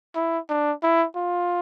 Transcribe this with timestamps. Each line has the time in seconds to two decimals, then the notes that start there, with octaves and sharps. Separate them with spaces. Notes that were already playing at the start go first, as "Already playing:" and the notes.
0.15 E4
0.49 D4
0.83 E4
1.16 F4